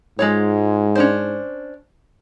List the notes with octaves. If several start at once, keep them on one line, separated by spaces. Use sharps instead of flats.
G#2 G#3 F4 C#5
C#4 D4 C5